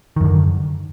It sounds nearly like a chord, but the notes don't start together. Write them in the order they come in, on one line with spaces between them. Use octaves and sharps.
D#3 F#2 D3